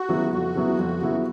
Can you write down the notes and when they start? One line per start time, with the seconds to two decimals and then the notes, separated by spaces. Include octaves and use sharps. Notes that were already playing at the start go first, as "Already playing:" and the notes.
Already playing: F#4
0.09 C#3 F#3 B3 E4
0.32 F2 F#4
0.55 C#3 F#3 B3 E4
0.79 F2
1.02 C#3 F#3 B3 E4